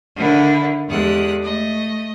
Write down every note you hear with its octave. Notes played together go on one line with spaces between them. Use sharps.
D3 D#3 E4
E2 G#3 G4 A4 D#6 F#6
A3 D#5